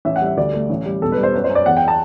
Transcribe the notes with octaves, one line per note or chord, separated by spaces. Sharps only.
A1 E5
F#5
G3
E5
D2 D5
A3
A1
G3
E1 A4
B4
G3
C5
F#2 B4
C5
F#2
D5
E2 F#5
G5
A5